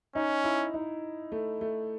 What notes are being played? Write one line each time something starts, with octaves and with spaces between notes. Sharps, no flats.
C#4 D#4
E4
D#4
A3
A3